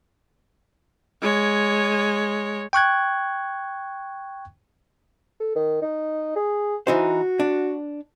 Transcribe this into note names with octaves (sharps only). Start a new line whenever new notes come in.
G#3 C#5
G5 C#6 F#6 G#6
A4
D#3
D#4
G#4
E3 D#4 F#4 C5
D4